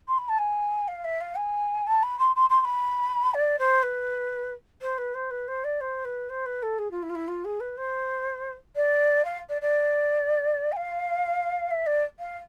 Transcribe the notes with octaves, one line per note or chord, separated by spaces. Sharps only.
C6
B5
A5
G#5
F5
E5
F5
G#5
A5
B5
C6
C6
C6
C6
B5
D5
C5
B4
C5
B4
C5
B4
C5
D5
C5
B4
C5
B4
A4
G#4
F4
E4
F4
E4
F4
G#4
B4
C5
D5
F5
D5
D5
G#5
F5
E5
D5
F5